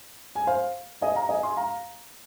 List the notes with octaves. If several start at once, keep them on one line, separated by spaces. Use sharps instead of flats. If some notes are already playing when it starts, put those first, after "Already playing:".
G#5
C5 F5
D#5 G#5
F5 A#5
D#5 G#5
G#5 C6
F5 A#5